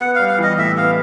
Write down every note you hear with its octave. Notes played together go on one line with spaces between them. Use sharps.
B3 F#5
G3 F5
F5
E3 D#5
A2 E5
B3 F5